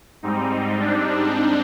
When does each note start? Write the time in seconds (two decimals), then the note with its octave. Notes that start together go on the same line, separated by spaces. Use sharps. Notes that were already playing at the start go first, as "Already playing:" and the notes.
0.23 G#2 G3 C4 D#4
0.80 D4